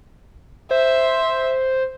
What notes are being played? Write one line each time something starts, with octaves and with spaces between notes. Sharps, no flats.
C5 E5